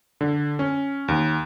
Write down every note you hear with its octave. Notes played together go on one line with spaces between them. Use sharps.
D3
C#4
D#2